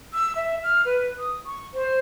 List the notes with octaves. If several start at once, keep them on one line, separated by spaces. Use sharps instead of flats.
E6
E5
F6
B4
D#6
C#6
C5